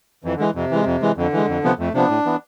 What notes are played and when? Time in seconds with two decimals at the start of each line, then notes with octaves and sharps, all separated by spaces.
0.24 F2 E3
0.35 D3
0.40 E3 G#3
0.55 F2 C3
0.71 E3 G#3
0.86 F2
1.02 E3 G#3
1.17 F2 D3
1.32 E3 G#3
1.48 F2
1.64 C3 F3 B3
1.79 F2 A3
1.94 C3 F3 B3 D4
2.09 A2
2.25 E3 B3